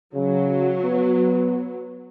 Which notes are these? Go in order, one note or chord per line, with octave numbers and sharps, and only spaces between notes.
C#3 F#3
B3